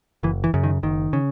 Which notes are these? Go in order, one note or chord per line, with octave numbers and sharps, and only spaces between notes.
F#1 E3
E3
F#2 C#3
D#3
F#1 D#3
C#3